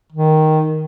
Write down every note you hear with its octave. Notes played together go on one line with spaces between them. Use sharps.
D#3